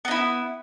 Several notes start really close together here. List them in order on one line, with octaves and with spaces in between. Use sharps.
B3 D#4 E4